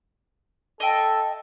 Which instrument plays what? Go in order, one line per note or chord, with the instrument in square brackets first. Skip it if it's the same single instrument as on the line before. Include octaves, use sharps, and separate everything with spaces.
[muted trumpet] A4 [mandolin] D#5 E5 G5